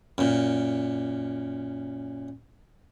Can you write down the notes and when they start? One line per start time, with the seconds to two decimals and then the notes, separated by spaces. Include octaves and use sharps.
0.18 F#2 A#2